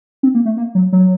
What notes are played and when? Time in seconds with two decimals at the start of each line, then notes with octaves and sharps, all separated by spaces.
0.23 C4
0.35 A#3
0.46 A3
0.57 A#3
0.75 F#3
0.93 F#3